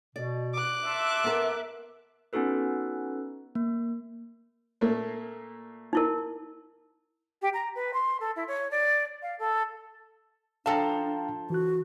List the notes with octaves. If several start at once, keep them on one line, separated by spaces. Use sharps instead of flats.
B2 D5
D6 F#6
E5 A5 C6 E6
B3 A#4
B3 C#4 D#4 F#4 A4 B4
A#3
A#2 A3 A#3
D#4 E4 A#4
G4
A#5
B4
C6
A4
E4
C#5
D5
F5
A4
F3 D4 A4 F5 G5 A5 A#5
D4
E3 F#4 F#6